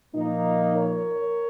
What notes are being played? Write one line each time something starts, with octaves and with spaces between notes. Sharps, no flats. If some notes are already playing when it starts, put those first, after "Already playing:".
A#2 F3 A#3 D#4
A#4 C#5